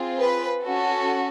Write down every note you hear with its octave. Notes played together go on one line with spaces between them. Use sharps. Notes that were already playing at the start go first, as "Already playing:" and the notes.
Already playing: C4 F4 G#4
B4
C#4 F#4 A4